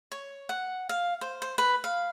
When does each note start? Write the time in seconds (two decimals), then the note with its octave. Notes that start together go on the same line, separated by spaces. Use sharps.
0.12 C#5
0.49 F#5
0.89 F5
1.21 C5
1.42 C5
1.58 B4
1.84 F5